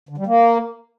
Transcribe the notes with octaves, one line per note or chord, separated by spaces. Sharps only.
D3
G3
A#3